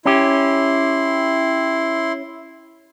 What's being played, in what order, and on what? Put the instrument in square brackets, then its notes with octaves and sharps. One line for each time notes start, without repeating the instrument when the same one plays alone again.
[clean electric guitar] C#4 G4 [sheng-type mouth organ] E4 C6